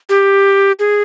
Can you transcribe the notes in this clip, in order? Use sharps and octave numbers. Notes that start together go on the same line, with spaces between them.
G4
G#4